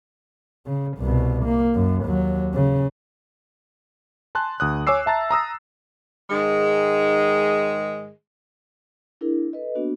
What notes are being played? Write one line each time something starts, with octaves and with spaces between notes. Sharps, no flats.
C#3
C2 B2
A#3
F#2
D#2 F#3
C#3
G#5 A5 C6 F#6
D2 D#6 F#6
C#5 G#5 D6 E6 C7
E5 A5 A#5 A6
A#5 D#6 E6 A#6
G#2 D#3 G#3
D4 E4 G#4 A#4
A4 B4 D#5
A#3 B3 D4 F#4